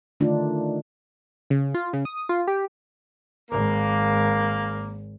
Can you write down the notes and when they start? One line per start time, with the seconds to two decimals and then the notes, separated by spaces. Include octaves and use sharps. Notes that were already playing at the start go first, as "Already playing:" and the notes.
0.20 D3 D#3 A3 D4 D#4 F4
1.50 C#3
1.74 F4
1.93 C#3
2.05 D#6
2.29 F4
2.48 G4
3.51 G#1 A#3